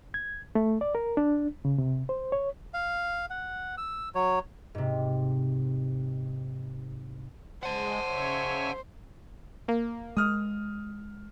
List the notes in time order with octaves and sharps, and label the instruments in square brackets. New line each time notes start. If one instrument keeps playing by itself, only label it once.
[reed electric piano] G#6
A3
D5
A#4
D4
C#3
C3
C5
C#5
[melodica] F5
F#5
E6
F#3 C#5
[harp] G#2 C3
[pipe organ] G#3 [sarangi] C5 [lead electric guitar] F#5 A5
[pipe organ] C#3 C#5 E5
[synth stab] A#3
[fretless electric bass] G#3 [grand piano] D#6 F6